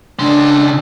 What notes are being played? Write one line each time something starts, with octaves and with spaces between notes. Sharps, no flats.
C#3 D4 C6